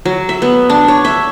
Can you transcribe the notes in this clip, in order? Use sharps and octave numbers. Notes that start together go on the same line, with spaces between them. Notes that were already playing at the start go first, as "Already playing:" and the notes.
F#3
E5
B3
D4
C#5
E5